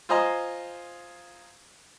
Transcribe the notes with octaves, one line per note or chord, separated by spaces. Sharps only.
F4 C5 D#5 G#5 A#5